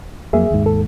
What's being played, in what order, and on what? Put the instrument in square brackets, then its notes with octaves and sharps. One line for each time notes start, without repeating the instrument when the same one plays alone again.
[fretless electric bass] F2 F#3 A#3 [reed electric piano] G#4 E5
[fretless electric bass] D#2 G#2
[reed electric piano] A4